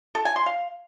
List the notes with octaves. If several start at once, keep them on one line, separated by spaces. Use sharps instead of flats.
A4
G#5
C6
F5